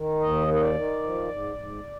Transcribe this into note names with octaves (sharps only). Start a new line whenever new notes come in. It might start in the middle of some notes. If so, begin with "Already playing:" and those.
Already playing: D#3
D#2 D#5
D#3
D#5
D5
D#3
F3
G#2
G#2